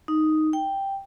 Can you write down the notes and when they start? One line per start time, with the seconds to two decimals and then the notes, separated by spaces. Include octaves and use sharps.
0.08 D#4
0.53 G5